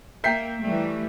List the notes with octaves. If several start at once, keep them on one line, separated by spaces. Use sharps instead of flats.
A#3 E5 G5 A#5 G6 B6 C7
E3 G3 A3